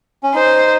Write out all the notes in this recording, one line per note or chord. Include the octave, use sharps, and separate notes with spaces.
C#4
D#4 C5